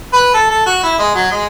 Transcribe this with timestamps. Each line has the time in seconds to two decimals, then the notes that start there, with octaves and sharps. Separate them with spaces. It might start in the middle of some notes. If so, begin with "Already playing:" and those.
0.13 B4
0.34 A4
0.50 A4
0.66 F#4
0.83 E4
0.99 G#3
1.15 F#3
1.31 G#3